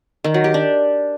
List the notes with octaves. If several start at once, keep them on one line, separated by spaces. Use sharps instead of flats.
D#3
F#3
G4
D4